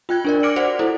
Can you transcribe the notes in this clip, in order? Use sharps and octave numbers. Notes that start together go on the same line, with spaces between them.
F4 G5 F#6 G#6
D4 A#4 D5
D6 F6 A#6 C#7 D7 F#7
F#4 C5 D5 F#5 F7
E4 A4 C5